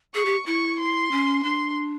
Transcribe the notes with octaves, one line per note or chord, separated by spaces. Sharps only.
G#4 C#6
G4
E4 C#6
C6
C#4
D4 C6